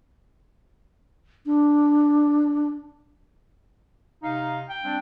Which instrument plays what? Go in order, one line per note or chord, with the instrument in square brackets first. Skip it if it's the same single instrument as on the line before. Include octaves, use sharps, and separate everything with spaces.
[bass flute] D4
[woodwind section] C3 D#4 F5
[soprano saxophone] G5
[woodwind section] G3 C4 D4